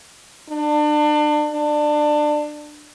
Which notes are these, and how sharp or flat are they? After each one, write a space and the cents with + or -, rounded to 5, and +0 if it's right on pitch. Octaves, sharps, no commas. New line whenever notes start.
D4 +30
D4 +20